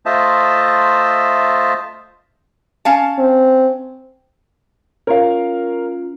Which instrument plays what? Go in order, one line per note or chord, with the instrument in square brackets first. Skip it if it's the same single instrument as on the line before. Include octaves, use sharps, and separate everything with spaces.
[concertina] A3 F4 C5 D#5 E5 A5
[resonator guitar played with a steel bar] C#4 F5 A5
[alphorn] C4
[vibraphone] C#4 F4 [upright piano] A#4 C#5 F5